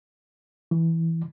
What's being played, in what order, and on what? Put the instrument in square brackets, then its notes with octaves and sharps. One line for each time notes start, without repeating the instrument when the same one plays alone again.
[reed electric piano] E3